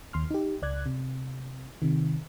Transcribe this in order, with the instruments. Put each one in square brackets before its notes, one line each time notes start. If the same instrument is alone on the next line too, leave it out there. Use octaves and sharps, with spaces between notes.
[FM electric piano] D#2 C6 F6
D#4 G4
C#2 D5 F#6 G#6
C3
C3 D#3